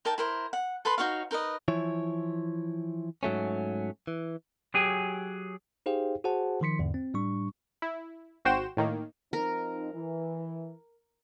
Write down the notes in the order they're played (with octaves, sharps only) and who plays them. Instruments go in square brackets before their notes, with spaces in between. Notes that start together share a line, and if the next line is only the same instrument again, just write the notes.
[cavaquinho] D#4 A#4 G5 A5
E4 A#4 C5
F#5
A4 B4 B5 C6
D#4 F#4 C#5 F5
D#4 A#4 B4 D#5
[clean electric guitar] E3 F3 E4 C#5
G#2 F#3 A3 C#4
E3
[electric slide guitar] F#3 G4 G#4 G5 G#5
[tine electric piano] D#4 G4 G#4 C5 F5 G5
F#4 G#4 C5 F#5 A5
D#3 F3 C6 B6 C#7
E2 G#2 D3
C4
A2 G3 D4 C#6
[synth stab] E4
G#1 F#4 C5 G5 E7
A2 D#3 A#3
[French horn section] F3 C4 D#4 [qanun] A#4
[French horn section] E3